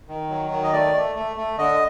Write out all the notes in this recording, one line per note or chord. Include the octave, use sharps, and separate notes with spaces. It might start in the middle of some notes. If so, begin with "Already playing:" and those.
D#3
F#3
D#3
D#5
A3 D5
A3
A3
A3
D3 D#5